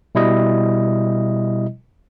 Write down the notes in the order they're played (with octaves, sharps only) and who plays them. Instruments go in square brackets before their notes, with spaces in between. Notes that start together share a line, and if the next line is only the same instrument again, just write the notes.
[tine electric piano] B2 G3 E4 D#5